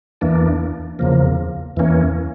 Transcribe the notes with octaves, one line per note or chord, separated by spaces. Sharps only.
E2 E3 A#3 D4
E2 C#3 F3 A#3
E2 E3 A#3 C#4